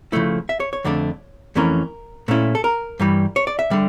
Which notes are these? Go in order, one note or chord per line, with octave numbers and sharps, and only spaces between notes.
C#3 F3 A3 E4
E5
C#5
C#5
F2 D3 A3 D4
F2 E3 A3 C#4 A#4
A#2 A3 C#4 E4
A4
A#4
G2 E3 G3
C#5
D5
E5
D3 G3